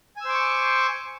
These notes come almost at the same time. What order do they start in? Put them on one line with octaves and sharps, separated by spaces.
G#5 E6 C5 D6 C#6